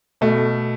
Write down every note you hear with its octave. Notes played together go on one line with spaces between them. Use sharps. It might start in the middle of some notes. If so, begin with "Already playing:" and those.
B2 A3